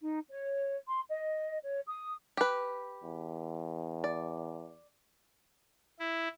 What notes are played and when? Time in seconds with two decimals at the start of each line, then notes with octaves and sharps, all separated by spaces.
0.01 D#4
0.29 C#5
0.87 C6
1.09 D#5
1.64 C#5
1.87 D#6
2.37 G4 B4
3.03 E2
4.04 D5
5.99 E4